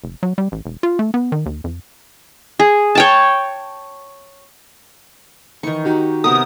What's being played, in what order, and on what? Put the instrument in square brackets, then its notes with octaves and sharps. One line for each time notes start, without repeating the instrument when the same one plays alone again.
[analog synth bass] F1
F#3
G3
A1
E1
F4
A3
B3
D#3
D#2
F2
[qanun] G#4
C#5 G5 A5
[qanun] D#3 C#6 [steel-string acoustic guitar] E3 D#4
[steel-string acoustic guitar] D#4 F#4 G4
[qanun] C3 B3 A#4 [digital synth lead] D#6